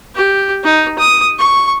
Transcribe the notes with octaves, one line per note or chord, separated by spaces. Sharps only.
G4
D#4
D#6
C#6